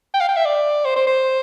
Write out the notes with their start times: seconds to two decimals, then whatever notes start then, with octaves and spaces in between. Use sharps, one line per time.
0.14 G5
0.21 F5
0.29 G5
0.37 E5
0.45 D5
0.85 C5
0.96 C5
1.07 C5